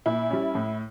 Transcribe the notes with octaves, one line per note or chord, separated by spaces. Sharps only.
A#2 E4
G3 C#4
A2